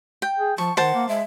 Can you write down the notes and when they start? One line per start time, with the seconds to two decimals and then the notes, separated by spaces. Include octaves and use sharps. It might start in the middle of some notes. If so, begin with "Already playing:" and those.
0.22 G5
0.38 G#4
0.58 F3 A5 C#6
0.77 D#3 C5 F#5 A5
0.94 A#3
1.09 G#3 E5